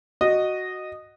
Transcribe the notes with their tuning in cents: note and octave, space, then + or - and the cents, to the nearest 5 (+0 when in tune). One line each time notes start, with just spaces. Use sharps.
F#4 +0 D#5 -10